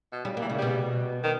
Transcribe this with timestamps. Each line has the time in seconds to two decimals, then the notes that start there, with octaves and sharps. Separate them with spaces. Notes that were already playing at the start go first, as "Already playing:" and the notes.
0.12 B2
0.25 C#3 G3
0.37 E3 A#3
0.50 C#3
0.58 B2 G3
1.24 D#3